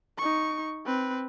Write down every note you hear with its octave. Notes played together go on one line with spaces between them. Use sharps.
D#4 C#6
C4 B4